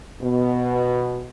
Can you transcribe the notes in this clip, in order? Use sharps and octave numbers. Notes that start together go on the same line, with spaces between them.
B2